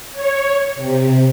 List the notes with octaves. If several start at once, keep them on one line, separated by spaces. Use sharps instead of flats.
C#5
C3